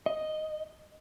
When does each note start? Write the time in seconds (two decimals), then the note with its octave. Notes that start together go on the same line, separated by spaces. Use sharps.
0.06 D#5